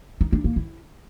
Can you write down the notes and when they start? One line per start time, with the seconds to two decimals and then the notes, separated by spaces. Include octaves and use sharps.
0.21 D#4
0.32 D4
0.44 A#3
0.56 E4